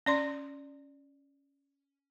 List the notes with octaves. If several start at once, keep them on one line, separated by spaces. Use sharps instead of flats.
C#4 D5 C6